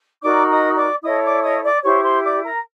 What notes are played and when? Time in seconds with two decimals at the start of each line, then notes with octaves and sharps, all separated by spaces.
0.22 D#4 F#4 A#4 D5 D6
0.49 D#5 D#6
0.76 D5 D6
1.03 E4 A4 C#5 D#5 D#6
1.23 D5 D6
1.43 D#5 D#6
1.63 D5 D6
1.83 E4 G4 C5 C#5 C#6
2.03 C5 C6
2.23 D5 D6
2.43 A#4 A#5